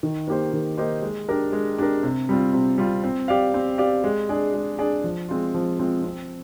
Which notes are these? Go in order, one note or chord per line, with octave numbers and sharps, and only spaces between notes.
D#3
A#3 D#4 G4 C5
D#3
A#3 D#4 G4 C5
G#3
D4 G4 A#4
G#3
D4 G4 A#4
C3
G3 C4 F4
C3
G3 C4 F4
C4
G4 D5 F5
C4
G4 D5 F5
G#3
D4 G#4 D5
G#3
D4 G#4 D5
F3
G#3 C4 F4
F3
G#3 C4 F4
C4